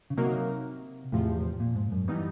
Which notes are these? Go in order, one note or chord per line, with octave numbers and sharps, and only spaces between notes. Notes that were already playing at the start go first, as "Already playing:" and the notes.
C#3
C3 F#3 A#3 D#4 F#4 A#4
E2 A2 C3 F3
A#2
G#2
F#2
E3 G3 B3 D#4